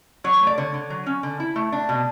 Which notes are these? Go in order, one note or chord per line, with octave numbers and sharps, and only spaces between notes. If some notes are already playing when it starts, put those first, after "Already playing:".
F#3 C#5
A3
D5
D3 C#5
D3
F#3
C#4
D3
E4
A3
D4
B2